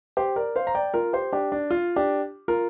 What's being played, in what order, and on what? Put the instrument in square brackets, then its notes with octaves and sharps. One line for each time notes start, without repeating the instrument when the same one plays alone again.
[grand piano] G4 C5
A#4 D5
C5 F5
A#5
D5 G5
F4 A#4
G4 C5
D4 G4
D4
F4
D4 G4
F4 A#4